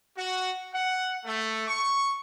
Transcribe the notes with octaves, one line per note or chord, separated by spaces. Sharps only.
F#4
F#5
A3
C#6